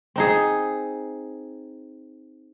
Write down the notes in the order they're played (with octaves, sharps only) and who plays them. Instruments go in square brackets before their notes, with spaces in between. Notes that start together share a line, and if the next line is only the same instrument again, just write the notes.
[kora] C4 D#4 G#4